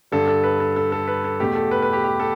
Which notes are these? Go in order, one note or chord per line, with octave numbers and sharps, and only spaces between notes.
G2 D3 G3 A4
A4
B4
A4
A4
A4
B4
A4
E2 B2 A3 G4
A4
B4
B4
G4
G4
A4